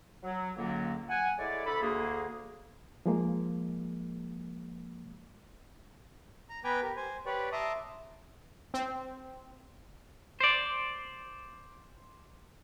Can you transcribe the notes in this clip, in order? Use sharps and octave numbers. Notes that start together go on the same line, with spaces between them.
F#3
C#2 D3 F#3 A#3
F#5 G#5
G#3 A3 E4 C#5 D5
D2 A4 B5
D2 A#3 G#4
F3 G#3 A#3
A#5
B3 B4 G5 G#5 A#5 D6
G4 A#4
C5 G#5
G4 B4 C#5 D5
E5 A5 A#5 C6 D6 D#6
C4
C5 D5